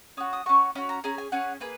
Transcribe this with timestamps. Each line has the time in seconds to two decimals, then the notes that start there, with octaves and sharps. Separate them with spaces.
0.17 C#4 F#4 D#6
0.33 D#6
0.46 C#4 F#4 C#6
0.75 C#4 F#4 B5
0.89 A#5
1.04 C#4 G#4 A#5
1.18 G#5
1.32 C#4 G#4 F#5
1.60 A#3 G#4 B4